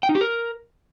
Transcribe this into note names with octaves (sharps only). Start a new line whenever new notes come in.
G5
D#4
G4
A#4